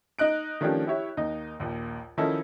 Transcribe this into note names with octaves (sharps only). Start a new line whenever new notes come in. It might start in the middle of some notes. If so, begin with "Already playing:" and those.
D#4 D#5 F#6 D7
D#3 F3 A3 C#4 D4 G4
E4 G4 C#5 E5
D#2 D#4 D#5
A#1 D#2
D#3 F3 C#4 D#4 E4 A4